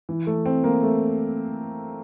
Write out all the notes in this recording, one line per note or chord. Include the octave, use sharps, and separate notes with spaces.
E3
A3
C4
A#3
A3